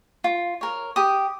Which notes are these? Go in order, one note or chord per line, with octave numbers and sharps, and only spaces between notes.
F4
A#4 C#5
G4 D#6